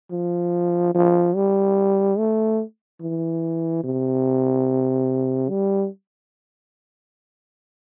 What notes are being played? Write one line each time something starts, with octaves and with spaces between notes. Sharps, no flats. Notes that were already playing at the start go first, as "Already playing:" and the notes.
F3
F3
G3
A3
E3
C3
G3